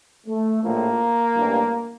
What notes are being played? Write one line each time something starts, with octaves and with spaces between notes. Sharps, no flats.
A3
A#1 A2 F3 A#3
A1 G2 E3